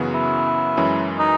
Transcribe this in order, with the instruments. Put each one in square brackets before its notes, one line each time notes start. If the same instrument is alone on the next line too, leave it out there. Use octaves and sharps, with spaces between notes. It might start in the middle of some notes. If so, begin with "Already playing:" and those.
Already playing: [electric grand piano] F#2 C#3 E3 B3 F#4
[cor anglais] E4
[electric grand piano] F#2 E3 G#3 C#4
[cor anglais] D#4